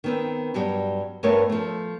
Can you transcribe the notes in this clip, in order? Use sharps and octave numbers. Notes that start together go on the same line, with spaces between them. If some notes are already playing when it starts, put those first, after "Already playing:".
D#3 B3 C4
G2 F#3 G3
G2 G3 A3 B3 A#4 C#5
F3 A3